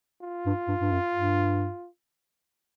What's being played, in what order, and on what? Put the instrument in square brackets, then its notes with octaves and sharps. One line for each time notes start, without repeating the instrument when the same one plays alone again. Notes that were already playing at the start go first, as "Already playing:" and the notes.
[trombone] F4
[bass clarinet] G2
G2
G2
F#2
G2